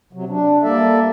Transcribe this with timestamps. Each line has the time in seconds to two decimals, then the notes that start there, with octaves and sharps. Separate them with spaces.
0.13 C3 F#3
0.29 D4
0.63 G3 A#3 A4 D5 E5